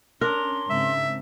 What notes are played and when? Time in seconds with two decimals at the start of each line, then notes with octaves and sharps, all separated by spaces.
0.21 C#4 D4 A#4 C6
0.70 G#2 C#3 C4 E5